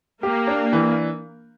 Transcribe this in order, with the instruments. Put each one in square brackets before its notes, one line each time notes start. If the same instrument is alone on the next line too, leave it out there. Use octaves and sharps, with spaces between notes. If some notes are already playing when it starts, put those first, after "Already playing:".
[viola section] A#3 [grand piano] G4
[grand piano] D4
E3